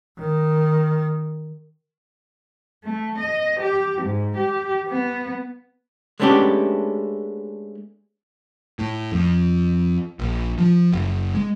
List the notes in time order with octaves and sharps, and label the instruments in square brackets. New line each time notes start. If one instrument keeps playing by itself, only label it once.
[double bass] D#3
[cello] A3
D#5
G4
G#2
G4
B3
[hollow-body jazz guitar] G#3 A3 B3 C#4 D4 G4
[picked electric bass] A2
F2
A#1
F3
F#1
G#3